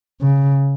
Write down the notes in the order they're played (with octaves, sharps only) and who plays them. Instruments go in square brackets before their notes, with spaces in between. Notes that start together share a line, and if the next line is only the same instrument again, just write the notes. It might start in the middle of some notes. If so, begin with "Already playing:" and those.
[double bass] C#3